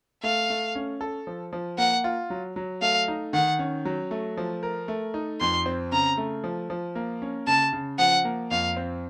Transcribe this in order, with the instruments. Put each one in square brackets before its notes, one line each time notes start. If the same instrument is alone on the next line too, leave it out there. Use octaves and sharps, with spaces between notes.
[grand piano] A3 [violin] F5
[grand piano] A3
C#4
A4
F3
F3
[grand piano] A#3 [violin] F#5
[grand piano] F4
F#3
F#3
[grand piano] A3 [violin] F5
[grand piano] D#4
[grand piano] D#3 [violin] F#5
[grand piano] C#4
F#3
A3
F3
A#4
A3
D#4
[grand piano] F2 [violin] C6
[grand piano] C4
[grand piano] C#3 [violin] A#5
[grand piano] A3
F3
F3
A#3
C#4
[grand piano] C#3 [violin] A5
[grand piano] C#3
[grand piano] F3 [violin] F#5
[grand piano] A#3
[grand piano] F2 [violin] F5
[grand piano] C4